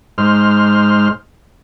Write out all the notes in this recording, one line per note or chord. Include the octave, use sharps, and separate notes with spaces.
G#2 C5 F6